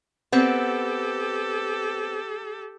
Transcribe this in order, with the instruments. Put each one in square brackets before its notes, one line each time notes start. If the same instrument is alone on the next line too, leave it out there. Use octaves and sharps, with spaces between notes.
[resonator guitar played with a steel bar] B3 C4 [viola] G4 A4